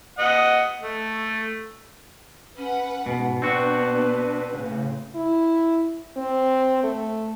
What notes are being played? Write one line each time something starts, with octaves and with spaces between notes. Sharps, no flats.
D#5 F#5
A3
C#4 B4 F#5
G#2 B2
B2 B3 C4 D4 F#4 B4
A2 C#3
E4
C4
A3